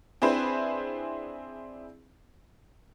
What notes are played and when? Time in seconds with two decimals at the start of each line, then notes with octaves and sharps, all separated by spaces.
0.22 C4 D4 E4 G#4 B4 C5